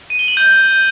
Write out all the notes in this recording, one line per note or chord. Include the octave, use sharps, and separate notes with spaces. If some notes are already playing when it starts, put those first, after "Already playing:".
D#7
G7
F#7
G6